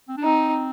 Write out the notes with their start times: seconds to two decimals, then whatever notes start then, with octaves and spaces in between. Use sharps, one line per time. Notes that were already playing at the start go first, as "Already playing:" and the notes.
0.09 C4
0.17 D4
0.23 C4 D#4